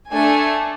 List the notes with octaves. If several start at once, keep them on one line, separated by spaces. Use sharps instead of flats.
A3 D4 A4 G#5